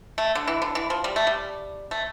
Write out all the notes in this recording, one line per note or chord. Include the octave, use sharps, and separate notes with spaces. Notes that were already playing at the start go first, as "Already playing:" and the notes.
A3
D3
E3
D3
E3
F3
G3
A3
G3
A3